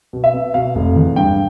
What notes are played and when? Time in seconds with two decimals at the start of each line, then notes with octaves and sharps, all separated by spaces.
0.13 B2
0.24 E5
0.34 B3
0.54 B2 F5
0.75 F1
0.96 E2
1.16 G2 G5